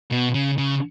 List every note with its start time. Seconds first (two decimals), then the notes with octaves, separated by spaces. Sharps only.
0.11 B2
0.34 C#3
0.58 C#3